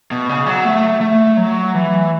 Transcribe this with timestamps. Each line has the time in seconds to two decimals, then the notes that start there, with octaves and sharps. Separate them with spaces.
0.11 B2
0.29 C#3
0.46 F#3
0.65 A3
1.01 A3
1.37 F#3
1.74 E3